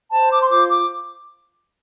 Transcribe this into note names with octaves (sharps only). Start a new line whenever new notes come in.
C5 A5
D6
C6
F4 D6
D6